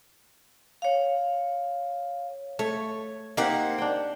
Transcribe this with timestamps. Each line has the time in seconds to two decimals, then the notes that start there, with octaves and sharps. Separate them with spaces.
0.82 C#5 F5
2.59 A3 C#5
3.37 A#3 C4 D#4 G4 A#4 F#5
3.78 D4 G5